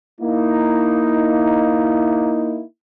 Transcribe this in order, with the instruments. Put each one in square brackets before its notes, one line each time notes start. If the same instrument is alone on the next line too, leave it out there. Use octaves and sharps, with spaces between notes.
[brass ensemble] A#3 D#4 E4